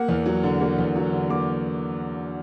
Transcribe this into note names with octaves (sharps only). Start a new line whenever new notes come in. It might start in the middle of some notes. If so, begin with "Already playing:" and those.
Already playing: A#3 F#5
E2
F#3
D3
A#3
E2
F#3
D3
A#3 D6